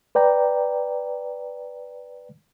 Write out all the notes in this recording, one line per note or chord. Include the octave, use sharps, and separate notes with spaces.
B4 D5 G5 A#5